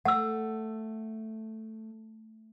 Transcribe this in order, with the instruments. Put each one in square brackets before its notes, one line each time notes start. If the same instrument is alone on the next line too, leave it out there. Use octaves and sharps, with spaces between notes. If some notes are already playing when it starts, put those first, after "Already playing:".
[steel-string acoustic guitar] A3 [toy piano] F#5 E6